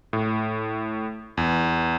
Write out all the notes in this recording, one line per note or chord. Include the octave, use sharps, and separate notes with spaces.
A2
E2